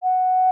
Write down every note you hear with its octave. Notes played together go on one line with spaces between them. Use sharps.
F#5